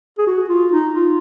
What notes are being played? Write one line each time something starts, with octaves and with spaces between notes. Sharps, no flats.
G#4
F#4
F4
D#4
F4